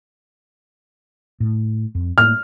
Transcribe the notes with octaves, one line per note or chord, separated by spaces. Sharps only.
A2
F2
A2 A#3 F6